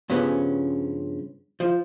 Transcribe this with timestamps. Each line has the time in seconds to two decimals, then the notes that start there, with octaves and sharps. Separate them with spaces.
0.10 G2 C#3 F3 B3 C#4
1.60 F3